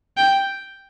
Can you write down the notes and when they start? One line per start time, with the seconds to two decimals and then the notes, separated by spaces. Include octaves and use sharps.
0.17 G5